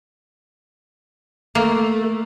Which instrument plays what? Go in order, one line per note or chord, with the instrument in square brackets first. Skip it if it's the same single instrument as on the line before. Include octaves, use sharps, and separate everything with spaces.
[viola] A3 [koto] A#3